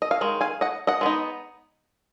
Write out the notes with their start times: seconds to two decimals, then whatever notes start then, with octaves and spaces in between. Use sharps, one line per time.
0.02 D#5
0.11 F5
0.21 D#3 G#3
0.41 F5 G#5
0.61 D#5 F#5
0.87 D#5 F#5
1.01 G#3 B3 D#4